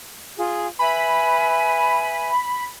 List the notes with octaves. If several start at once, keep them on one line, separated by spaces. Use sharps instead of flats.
F4 G#4
B4 E5 G#5 B5